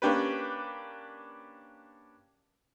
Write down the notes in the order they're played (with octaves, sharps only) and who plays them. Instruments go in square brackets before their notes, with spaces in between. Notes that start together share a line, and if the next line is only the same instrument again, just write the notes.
[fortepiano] A#3 C#4 D4 G4 B4